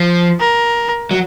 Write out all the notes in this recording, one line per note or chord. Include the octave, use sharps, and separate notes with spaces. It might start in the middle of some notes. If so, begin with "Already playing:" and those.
Already playing: F3
A#4
F#3